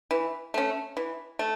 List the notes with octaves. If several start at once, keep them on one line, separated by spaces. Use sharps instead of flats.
E3
A3 C#4
E3
A3